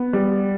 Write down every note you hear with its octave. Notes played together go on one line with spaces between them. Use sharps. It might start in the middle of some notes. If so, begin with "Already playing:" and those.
Already playing: B3
G3